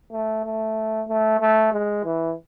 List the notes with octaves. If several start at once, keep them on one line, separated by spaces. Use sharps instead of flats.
A3
A3
A3
A3
G#3
E3